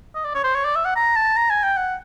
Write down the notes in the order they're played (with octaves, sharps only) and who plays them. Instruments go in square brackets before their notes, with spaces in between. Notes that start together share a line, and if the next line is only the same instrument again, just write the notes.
[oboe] D#5
D5
C#5
C5
C#5
D5
E5
F#5
A#5
A5
A#5
G#5
G5
F#5